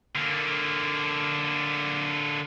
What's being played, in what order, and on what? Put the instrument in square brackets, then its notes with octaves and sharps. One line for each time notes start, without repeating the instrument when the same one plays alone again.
[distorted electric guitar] D3 A#3